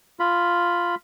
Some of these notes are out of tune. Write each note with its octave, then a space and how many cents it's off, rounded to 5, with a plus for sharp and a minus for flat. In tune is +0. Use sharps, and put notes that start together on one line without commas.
F4 +0 B5 +0